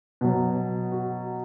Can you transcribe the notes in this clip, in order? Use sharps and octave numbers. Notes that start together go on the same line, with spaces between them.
B2 F#3
F#4